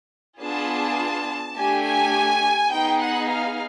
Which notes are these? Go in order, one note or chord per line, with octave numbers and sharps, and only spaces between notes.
B3 D4 F4 G#4 A5
A3 D4 G4 G#5
G#5
B3 D#4 G#4 G5
F#5
F5